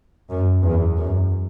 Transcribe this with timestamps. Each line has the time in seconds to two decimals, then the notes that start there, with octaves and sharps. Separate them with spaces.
0.30 F#2
0.63 E2
0.97 F#2